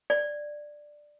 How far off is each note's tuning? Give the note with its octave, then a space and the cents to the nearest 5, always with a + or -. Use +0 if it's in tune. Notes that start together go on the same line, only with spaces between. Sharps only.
D5 +10